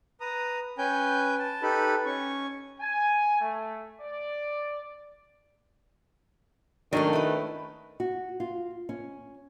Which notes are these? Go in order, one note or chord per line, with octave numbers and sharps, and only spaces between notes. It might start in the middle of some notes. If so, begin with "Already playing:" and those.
B4 A#5 D#6
C#4 B4 G5 G#5 G6
A5
D#4 G4 A4 B4 B5
C#4 C#6
G#5
A3
D5
D#3 F#3 A3 C#4 D4
E4 B4
F#4
F4
C#4